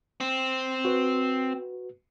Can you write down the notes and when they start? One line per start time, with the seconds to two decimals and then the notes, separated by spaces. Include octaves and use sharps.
0.20 C4
0.85 F#4 B4